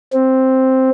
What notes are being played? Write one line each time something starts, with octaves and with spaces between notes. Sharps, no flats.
C4